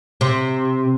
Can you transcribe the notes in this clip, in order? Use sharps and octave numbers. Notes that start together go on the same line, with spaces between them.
C3